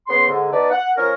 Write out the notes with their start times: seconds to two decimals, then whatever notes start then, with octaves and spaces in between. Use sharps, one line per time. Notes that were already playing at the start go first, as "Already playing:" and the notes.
0.07 C#3 B3 C6
0.27 G#2 D3
0.51 B3 D#4 B4 D5 A5
0.69 F#5
0.97 F3 C#4 A#4